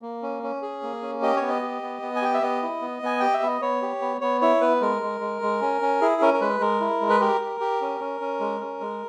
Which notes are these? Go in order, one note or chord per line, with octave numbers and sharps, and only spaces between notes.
A#3
C#4
C#4
G#4
A#3
C#4
G4 D#5
C#5
B3
D#5
G4
B3
B3
G#5
G4 G5
E5
B3 D#5
E4
B3
B3 G#5
G4 G5
E5
B3 D#5
B3 C#5
G4
B3
B3 C#5
E4 C#5
B3 B4
G#3 A#4
G#3
G#3
G#3
C#4
C#4
E4 G#4
C#4 A#4
A#4
G#3 B4
G#3 A#4
E4
G#3
B4
G4 A#4
G4
G4
C#4
C#4
C#4
G#3
C#4
G#3